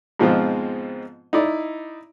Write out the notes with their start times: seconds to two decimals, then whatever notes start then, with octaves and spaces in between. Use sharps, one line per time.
0.20 G#2 B2 F3 G#3 C4 F4
1.33 D#4 E4 D5